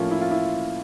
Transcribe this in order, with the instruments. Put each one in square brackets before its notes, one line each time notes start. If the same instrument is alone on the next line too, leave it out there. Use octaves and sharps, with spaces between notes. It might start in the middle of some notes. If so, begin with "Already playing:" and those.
Already playing: [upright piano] A2 F3 A#3 C#4 F4
E4
F4
E4